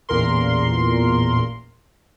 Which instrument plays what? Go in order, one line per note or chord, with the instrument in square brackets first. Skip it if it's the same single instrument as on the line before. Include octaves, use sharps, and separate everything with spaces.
[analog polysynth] A1 E2 A#2 A#4 C6